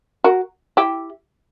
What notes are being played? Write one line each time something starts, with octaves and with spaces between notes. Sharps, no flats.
F#4 A#4
E4 G4